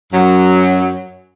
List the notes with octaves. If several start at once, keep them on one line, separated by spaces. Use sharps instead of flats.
F#2 F#3